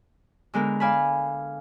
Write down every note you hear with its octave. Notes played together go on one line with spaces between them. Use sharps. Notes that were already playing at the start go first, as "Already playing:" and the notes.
D3 G#3 B3 A#4
D5 F5 G#5 A5 B5